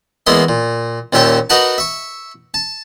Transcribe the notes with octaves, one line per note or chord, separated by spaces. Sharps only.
E2 G#3 A#3 B3 E5 C6
A#2
D#2 A#2 C#4 E5 G5 A5
D#4 F#4 A#4 B4 F#5 A5
E5 C#6
A5